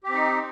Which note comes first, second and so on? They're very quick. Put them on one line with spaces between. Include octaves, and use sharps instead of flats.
G4 C4 D#4